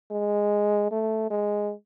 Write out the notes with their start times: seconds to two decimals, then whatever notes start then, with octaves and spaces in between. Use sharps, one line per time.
0.11 G#3
0.92 A3
1.31 G#3